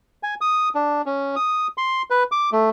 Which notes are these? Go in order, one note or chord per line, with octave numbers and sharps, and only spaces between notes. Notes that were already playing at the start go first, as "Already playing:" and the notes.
G#5
D#6
D4
C#4
D#6
C6
B4
D6
A3